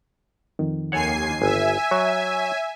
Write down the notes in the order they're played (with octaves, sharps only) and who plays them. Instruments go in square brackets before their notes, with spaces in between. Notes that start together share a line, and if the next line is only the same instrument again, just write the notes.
[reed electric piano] F2 D#3
[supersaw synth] D#2 G#5 C7 [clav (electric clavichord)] A4 C#5 F#5
[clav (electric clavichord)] G1 [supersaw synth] E5 G#5
[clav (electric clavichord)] F#3 [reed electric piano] C#5